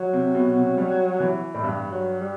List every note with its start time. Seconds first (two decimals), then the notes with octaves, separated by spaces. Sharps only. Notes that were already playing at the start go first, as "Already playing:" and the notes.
Already playing: F#3
0.13 C3
0.35 B2
0.57 C3
0.78 G3
1.20 E3
1.54 A2
1.63 G2 G3
1.92 F#3
2.21 G3